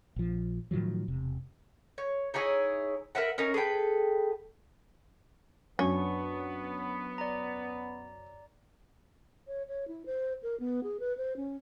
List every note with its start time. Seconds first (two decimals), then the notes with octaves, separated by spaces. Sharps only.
0.16 A#1 F3
0.71 A2 D#3 F3 F#3
1.08 E1 C3
1.98 C#5
2.34 D#4 E4 G#4 C#5
3.15 A#4 B4 E5 F#5
3.38 C#4 D#4 A#4
3.54 G#4 A4 B4 G5
5.79 F#2 B3 C#4 D4 C#6
7.18 D5 A#5
9.47 C#5
9.68 C#5
9.88 E4
10.06 C5
10.43 A#4
10.60 B3
10.83 G#4
11.00 B4
11.17 C5
11.37 C#4